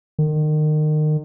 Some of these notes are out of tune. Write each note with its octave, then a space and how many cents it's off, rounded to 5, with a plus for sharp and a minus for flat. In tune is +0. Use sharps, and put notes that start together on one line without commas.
D#3 -30